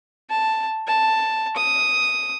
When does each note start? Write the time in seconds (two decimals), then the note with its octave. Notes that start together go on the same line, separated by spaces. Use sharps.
0.30 A5
0.87 A5
1.56 D#6